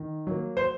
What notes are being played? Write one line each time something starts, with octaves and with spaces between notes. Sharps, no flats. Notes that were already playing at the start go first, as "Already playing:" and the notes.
Already playing: D#3
F#3 A#3
C5